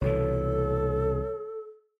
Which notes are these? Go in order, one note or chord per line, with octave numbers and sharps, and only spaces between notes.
C2 B2 E3 A4 C#5